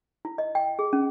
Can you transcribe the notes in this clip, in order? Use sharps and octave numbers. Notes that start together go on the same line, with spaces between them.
E4
D#5
G5
G#4
C#4